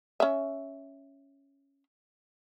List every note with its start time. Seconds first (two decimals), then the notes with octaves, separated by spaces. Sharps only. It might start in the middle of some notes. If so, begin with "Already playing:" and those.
0.20 C#4 E5